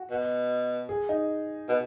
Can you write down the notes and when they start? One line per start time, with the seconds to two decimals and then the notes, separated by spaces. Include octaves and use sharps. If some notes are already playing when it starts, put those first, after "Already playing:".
Already playing: F#4
0.10 B2
0.89 G#4
1.09 D#4
1.69 B2